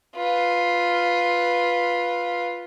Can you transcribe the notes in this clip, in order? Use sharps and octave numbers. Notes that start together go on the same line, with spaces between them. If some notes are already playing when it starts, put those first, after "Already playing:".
F4 B4